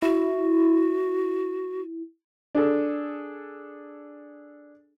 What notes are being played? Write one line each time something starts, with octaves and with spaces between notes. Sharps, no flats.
E4 F#4
D4 G#4 A4